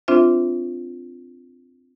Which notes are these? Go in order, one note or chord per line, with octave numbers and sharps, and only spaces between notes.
C4 D4 F4 C5 E5